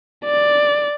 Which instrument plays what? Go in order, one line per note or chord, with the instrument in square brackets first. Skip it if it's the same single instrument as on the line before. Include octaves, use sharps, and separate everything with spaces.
[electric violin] D5